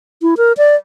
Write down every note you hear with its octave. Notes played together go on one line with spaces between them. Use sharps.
E4
A#4
D5